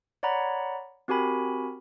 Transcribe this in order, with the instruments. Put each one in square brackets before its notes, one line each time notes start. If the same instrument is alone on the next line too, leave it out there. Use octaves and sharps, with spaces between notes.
[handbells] C#5 D5 F#5 A#5 B5
C4 F#4 G4 A#4 G#5 B5